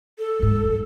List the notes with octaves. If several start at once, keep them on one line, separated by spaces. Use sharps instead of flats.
A4
F#1 G#2
F#2